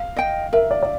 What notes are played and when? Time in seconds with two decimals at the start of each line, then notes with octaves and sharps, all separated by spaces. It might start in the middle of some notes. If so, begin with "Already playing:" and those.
Already playing: F5
0.16 D#5 G5
0.53 A#4 E5
0.71 D5
0.83 D5